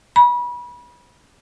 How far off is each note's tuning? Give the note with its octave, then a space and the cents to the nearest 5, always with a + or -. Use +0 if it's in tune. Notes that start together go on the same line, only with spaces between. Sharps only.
B5 -30